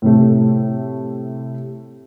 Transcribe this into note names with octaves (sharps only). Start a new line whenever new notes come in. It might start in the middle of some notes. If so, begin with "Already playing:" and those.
A2 C3 A3